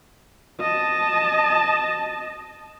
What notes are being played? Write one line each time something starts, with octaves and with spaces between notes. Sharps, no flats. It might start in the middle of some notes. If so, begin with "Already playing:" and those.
D#5 A5